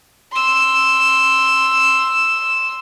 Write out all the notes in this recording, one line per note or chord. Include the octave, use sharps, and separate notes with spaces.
C6 E6